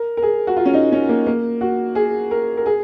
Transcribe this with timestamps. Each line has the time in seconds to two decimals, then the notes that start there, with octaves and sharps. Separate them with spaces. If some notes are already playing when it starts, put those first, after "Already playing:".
Already playing: A#4
0.17 A#4
0.22 G#4
0.47 F#4
0.57 F4
0.66 C#4
0.74 D#4
0.92 C#4
1.09 A#3
1.27 A#3
1.61 F#4
1.95 G#4
2.31 A#4
2.57 A#4
2.66 G#4